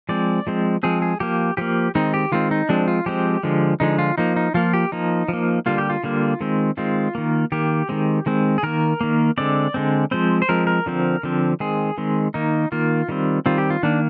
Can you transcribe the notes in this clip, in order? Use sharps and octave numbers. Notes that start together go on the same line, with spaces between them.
F3 G#3 C4 D5
F3 G#3 C4
F3 G#3 C4 G#4
G#4
F3 A#3 G4
F3 A#3 G4
D#3 G#3 C4 D#4
G4
D#3 G#3 C4 F4
D#4
F3 G#3 C4 D4
F4
F3 G#3 C4 G4
D3 F3 G#3
D3 F3 G#3 D#4
F4
F3 A#3 D#4
D#4
F3 A#3 F4
G4
F3 A#3 D#4
F3 A#3
D3 G3 A#3 F4
G4
F4
D3 G3 A#3
D#3 G#3 C4
D#3 G#3 C4 F4
D#3 A#3
D#3 A#3 G4
D#3 G#3 C4
D#3 G#3 C4
G#4
D#3 A#3 A#4
D#3 A#3
D3 G#3 C4 D5
D3 G#3 C4
F3 G#3 C4 C5
C5
F3 G#3 C4 A#4
A#4
D3 F3 C4
D3 F3 C4
D#3 G#3 C4 G#4
D#3 G#3 C4
D#3 A#3 D#4
D#3 A#3 F4
D#3 G3 C4
D#3 G3 C4 F4
G4
F4
D#3 A#3 D4